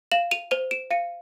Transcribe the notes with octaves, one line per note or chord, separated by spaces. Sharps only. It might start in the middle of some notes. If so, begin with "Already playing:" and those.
F5 E7 F#7
D#7 F7
C5 D#7 F7
D7 E7
F5 C#7 D#7